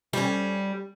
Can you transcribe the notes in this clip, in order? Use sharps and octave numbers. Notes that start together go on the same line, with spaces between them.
G3 C#4